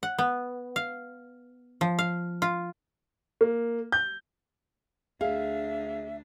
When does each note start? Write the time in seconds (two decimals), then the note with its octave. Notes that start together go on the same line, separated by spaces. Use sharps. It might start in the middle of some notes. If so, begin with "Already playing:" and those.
0.03 F#5
0.18 B3
0.76 F5
1.81 F3
1.99 F5
2.42 F4
3.41 A#3
3.92 G6
5.21 D2 D4 G#4 E5 F5